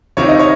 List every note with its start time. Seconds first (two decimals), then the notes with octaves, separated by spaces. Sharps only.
0.17 C3 D#3 C#5
0.29 D#5
0.39 C#5